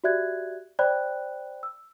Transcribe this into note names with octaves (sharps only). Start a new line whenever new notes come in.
F#4 G4 D5 E5 F#6 G#6
C5 D5 G5 B5 F#6
E6